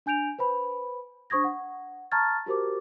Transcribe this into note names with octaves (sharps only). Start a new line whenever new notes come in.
D4 G#5 G6 D7 F7
B4 C5 B5
D4 C5 C#6 D#6 G#6 A#6
F#5
A5 A#5 C#6 F6 G#6 A6
F#4 G4 A#4 C5 D6